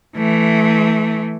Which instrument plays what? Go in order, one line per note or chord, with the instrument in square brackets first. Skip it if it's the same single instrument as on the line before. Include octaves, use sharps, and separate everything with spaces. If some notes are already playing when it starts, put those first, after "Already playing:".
[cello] E3 A3